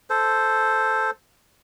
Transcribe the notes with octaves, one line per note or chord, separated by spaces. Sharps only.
A4 C5